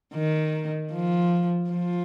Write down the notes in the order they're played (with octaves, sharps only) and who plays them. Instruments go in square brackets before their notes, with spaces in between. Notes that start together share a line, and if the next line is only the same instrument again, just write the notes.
[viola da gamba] D#3
F3
F3